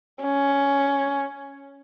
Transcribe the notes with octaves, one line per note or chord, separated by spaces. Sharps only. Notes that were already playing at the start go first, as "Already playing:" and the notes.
C#4